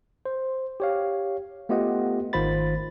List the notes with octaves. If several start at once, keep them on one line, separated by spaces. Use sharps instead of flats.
C5
G4 C#5 F5
A3 B3 F4 G4 D#5 F#5
G#1 D#3 F4 C5 B5 A6